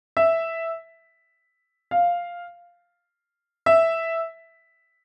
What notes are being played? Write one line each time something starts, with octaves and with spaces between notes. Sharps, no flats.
E5
F5
E5